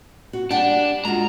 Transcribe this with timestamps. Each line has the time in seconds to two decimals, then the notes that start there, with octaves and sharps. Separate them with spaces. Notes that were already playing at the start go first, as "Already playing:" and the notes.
0.33 F#4
0.51 G3 D4 F#5 G5
1.05 G#3 F4 F#4 A#5